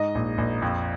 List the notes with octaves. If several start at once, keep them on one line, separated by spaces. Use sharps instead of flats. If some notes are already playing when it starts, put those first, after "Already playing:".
Already playing: G#2 D#5
A#1
A#1
F2